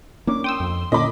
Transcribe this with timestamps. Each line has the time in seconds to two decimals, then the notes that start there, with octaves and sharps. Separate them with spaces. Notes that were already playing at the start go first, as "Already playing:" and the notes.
0.27 A#3 C#4 D4 D6
0.44 G5 C6 D#6 E6
0.60 F2
0.92 A#2 D3 C#4 D#5 B5 D6